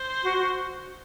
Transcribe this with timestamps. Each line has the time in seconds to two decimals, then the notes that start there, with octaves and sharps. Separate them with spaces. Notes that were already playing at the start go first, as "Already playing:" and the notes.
Already playing: C5
0.23 F#4
0.37 F#4